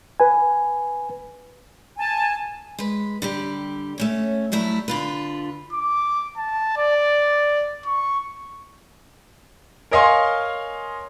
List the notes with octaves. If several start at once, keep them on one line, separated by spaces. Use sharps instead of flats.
B4 G#5
G#5 A5
G#3 B4
D3 G3 G4
A3 C#4 C#5
F#3 G3 A3 E4
D3 F4 B4
D6
A5
D5
C#6
A#4 C#5 D#5 F5 G#5 C6